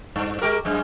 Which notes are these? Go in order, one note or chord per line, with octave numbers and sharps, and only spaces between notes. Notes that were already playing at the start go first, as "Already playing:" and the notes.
G2
G#3 G4 A#4
F#2 G#3